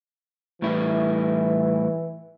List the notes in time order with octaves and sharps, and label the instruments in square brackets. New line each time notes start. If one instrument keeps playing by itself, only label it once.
[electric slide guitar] A2 G3 E4 [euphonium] E3